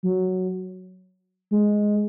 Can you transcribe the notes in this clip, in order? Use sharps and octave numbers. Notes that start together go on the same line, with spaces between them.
F#3
G#3